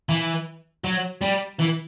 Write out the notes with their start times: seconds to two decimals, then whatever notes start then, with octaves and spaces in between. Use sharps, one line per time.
0.09 E3
0.84 F#3
1.21 G3
1.59 E3